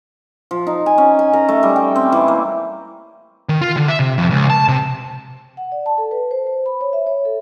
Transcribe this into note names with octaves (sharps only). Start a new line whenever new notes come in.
F3
D#4
G#5
C#4
G#5
A#4
A3
G3
G5
C4
E3
A#3
D#3
F4
D3
E5
C3
F2
C#2
A5
C3
F#5
D5
A5
A4
B4
C5
C5
B5
C#5
E5
C#5
A4